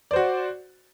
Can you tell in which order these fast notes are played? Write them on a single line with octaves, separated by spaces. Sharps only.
D5 C5 F#4